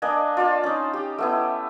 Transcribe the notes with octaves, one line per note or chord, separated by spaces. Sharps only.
A#3 D4 D#5 G#5
F4 D5 A5
C#4 D#4
G4
A3 B3 E4